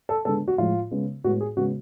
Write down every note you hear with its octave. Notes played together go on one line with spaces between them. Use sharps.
A4
D3 G#3 B3 A4
F#4
A2 F3 G#3 F4
C#3 G#3 B3
A2 G#3 B3 F#4
G#4
C#3 G#3 B3 F#4